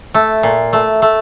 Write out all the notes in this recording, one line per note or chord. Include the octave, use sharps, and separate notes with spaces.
A3
A#2
A3
A3